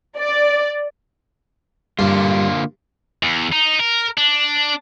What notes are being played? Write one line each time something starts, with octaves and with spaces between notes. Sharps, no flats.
D5
G2 D3 A#3 F4
E2
D#4
A#4
D4